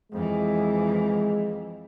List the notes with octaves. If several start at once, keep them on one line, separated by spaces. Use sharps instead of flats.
F2 E3 G#3